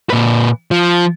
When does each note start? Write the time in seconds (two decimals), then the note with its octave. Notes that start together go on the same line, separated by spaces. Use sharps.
0.10 A#2 B4
0.71 F3